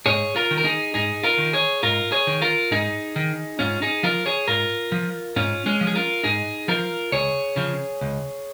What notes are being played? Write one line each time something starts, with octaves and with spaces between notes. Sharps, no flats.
G#2 G#4 C#5
F4 A#4
D#3
A#4
D#4 G#4
G#2 D#4 G#4
F4 A#4
D#3
G#4 C#5
G#2 F4 A#4
G#4 C#5
D#3
F4 A#4
G#2 D#4 G#4
D#3
G#2 C#4 F4
D#4 G#4
F3 F4 A#4
G#4 C#5
G#2 F4 A#4
F3
G#2 C#4 F4
G#3 C#4
F3
G#4
F4 A#4
G#2 D#4 G#4
F3 F4 A#4
C#2 G#4 C#5
C#3 F3
C#2